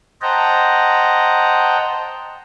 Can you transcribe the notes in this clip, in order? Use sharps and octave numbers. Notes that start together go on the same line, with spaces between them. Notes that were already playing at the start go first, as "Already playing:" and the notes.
C5 D#5 F#5 G5 A5 A#5